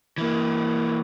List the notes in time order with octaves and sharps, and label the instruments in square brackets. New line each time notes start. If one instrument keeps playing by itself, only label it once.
[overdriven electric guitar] E3 A#3